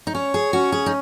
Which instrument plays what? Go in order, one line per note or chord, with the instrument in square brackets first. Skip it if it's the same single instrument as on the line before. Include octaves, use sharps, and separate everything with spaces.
[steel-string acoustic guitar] D#4
[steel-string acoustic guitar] C#4 [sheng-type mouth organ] C#5
[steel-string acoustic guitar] G#4
[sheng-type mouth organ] C#4 [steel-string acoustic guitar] F#4
[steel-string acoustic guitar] G#4
D#4